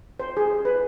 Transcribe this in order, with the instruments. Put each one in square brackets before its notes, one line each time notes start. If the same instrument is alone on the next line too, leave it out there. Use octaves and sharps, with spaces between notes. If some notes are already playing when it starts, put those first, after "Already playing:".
[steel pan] C5
G#4
B4